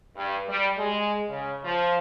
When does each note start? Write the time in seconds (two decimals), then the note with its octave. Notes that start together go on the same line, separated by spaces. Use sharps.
0.17 G2
0.50 G3
0.78 G#3
1.29 C#3
1.65 F3